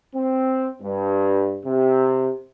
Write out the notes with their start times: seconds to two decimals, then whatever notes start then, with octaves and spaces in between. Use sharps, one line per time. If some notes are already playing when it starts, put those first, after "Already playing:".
0.15 C4
0.81 G2
1.65 C3